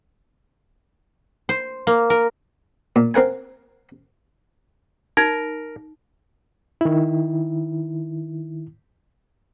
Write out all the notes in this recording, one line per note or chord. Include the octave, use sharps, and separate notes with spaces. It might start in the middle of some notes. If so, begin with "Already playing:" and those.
C5
A#3
A#4
A#2
C4 A#4 F#5 G#5
D#4 A#4
D#3 E4